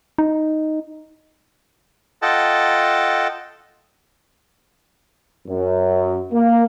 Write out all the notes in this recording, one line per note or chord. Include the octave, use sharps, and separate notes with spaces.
D#4
F4 A4 D#5 F#5 G5 A5
F#2
A#3